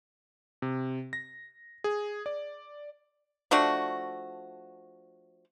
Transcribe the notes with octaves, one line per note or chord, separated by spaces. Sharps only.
C3
A#6
G#4
D5
F3 A3 D4 F#4